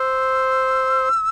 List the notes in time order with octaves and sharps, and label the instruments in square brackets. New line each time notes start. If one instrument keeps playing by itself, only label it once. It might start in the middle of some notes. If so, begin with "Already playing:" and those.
Already playing: [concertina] C5 [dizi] E6